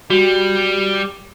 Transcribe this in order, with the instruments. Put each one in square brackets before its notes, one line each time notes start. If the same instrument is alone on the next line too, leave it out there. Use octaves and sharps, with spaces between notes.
[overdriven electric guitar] G3 [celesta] F#4